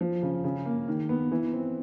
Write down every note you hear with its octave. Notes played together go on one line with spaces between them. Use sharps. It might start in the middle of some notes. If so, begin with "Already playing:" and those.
F3
C#3
C#3
A#3
D#3
B3
E3
C4